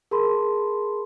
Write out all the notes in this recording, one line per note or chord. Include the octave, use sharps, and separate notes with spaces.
G#4 A#4 A5 B5 C6